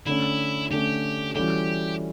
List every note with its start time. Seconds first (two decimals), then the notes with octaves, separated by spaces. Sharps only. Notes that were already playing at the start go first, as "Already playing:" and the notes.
0.06 D3 A3 C#4 E4
0.71 D3 A3 C#4 G4
1.35 E3 G3 C#4 F#4 G4 A4